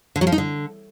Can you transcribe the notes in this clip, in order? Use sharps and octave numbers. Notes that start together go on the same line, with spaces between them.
D3
F#3
F3
D#4
D3